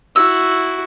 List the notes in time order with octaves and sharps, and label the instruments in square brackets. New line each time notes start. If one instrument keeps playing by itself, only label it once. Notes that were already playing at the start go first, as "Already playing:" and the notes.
[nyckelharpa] E4 F#4 [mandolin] E6